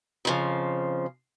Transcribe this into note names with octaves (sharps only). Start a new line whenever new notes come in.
F2 C#3 F3